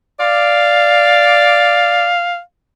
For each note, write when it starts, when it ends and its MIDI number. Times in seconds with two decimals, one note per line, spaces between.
0.20 2.12 74
0.20 2.40 77